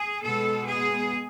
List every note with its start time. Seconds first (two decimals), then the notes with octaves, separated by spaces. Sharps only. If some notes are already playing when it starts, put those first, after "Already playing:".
Already playing: G#4
0.23 B2 G#3 B3 A4
0.67 G#4